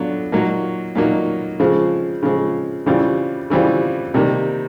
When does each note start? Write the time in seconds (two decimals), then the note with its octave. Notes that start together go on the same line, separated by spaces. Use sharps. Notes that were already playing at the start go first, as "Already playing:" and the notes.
Already playing: F#3 B3 D4 F4 A4
0.32 A#2 F#3 A#3 D#4
0.95 A#2 F#3 A#3 D#4
1.60 C#3 F3 G#3 C4
2.23 C#3 F3 G#3 C4
2.86 C#3 E3 G3 C4 F4
3.50 C#3 E3 G3 C4 F4
4.14 C3 D#3 G3 A#3